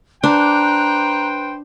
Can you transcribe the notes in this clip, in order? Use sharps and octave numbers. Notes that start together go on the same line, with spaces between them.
D4 B4 C5 G5 A#5 F#6